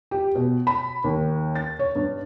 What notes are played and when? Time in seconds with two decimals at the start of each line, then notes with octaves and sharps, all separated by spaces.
0.11 G4
0.35 B2
0.67 B5
1.04 D#2
1.55 A6
1.79 C#5
1.95 G2